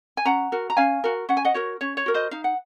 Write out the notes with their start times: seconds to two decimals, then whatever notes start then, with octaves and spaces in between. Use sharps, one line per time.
0.17 G#5
0.25 C#4 F#5 A#5
0.52 F#4 A#4
0.70 A#5
0.77 C#4 F5 G#5
1.04 F#4 A#4
1.29 C#4 F#5
1.37 G#5
1.45 D#5 F#5
1.54 F#4 A#4 C#5
1.81 C#4 C#5
1.97 C#5
2.06 F#4 A#4
2.14 C5 D#5
2.31 D#4 F5
2.44 F#5